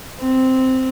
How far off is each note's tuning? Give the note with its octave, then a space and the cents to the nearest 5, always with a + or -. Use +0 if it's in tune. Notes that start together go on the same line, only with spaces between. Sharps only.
C4 -5